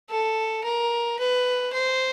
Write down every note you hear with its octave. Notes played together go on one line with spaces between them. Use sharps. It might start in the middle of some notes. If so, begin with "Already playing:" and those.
A4
A#4
B4
C5